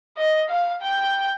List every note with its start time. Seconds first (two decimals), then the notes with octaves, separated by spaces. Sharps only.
0.17 D#5
0.49 F5
0.81 G5